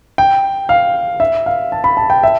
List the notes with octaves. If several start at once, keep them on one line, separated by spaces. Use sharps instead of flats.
G5
F5
E5
F5
A5
B5
A5
G5
E5